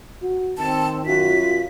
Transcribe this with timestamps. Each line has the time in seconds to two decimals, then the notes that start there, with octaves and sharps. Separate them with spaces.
0.22 F#4
0.58 D#3 C4 A5
1.06 F#2 F4 F#4 B6